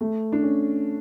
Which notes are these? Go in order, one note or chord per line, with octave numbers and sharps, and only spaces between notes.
A3
D4
C#4